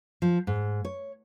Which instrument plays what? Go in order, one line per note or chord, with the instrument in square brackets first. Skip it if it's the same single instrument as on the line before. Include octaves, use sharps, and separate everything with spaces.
[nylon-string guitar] F3
G#2
C#5